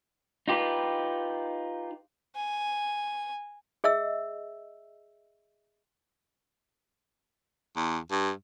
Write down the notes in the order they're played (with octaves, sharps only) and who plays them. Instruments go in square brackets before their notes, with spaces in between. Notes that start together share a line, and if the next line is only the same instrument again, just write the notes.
[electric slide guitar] D#4 F4 G4 B4
[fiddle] G#5
[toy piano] G#4 D#5 E5 E6
[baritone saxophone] E2
G2